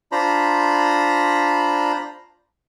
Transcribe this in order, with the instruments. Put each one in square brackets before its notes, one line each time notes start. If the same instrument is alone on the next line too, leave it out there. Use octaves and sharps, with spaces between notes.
[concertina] D4 F4 C5 A#5 B5